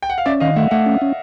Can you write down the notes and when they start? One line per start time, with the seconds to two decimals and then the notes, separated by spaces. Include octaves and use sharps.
0.02 G5
0.10 F#5
0.18 F5
0.26 C#4 D5 E5
0.40 D#3 D#5 F5
0.56 A3 E5 F#5
0.71 A3 E5 F#5
0.86 C#4
1.02 C#4